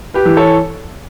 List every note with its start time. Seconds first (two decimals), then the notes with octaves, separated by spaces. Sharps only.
0.14 G4 B4
0.25 E3
0.37 A4 C#5